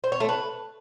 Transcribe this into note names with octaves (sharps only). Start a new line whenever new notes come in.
C5
C#5
A3
B4